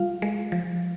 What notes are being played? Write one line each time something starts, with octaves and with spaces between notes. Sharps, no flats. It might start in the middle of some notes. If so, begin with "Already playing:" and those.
Already playing: G3 F4 F5
G#3
F3